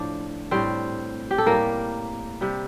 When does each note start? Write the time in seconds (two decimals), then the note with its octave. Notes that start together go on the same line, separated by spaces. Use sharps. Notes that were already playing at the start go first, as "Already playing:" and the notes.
Already playing: A2 F3 D4 D5
0.51 A2 G3 C4 C5
1.31 G4
1.38 A4
1.46 A2 G3 A#3 A#4
2.41 C3 G3